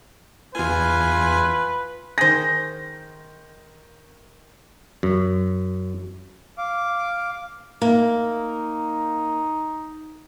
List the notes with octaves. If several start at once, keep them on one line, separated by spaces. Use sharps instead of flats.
E2 F4 B4 G#5
D#3 G#4 C5 A#6
F#2
F5 D6
A#3 D#4